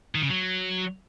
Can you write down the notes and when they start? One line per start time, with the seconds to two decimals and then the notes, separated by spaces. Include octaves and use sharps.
0.15 D#3
0.22 C#3
0.30 F#3